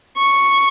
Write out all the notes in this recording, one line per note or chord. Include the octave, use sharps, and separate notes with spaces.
C#6